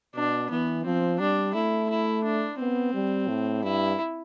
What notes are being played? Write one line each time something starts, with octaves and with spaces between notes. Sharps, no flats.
B2 D4
E3 B3
F3 C4
G3 D4
A3 E4
E4
D4
B3 C4
G3
A2
G2 E4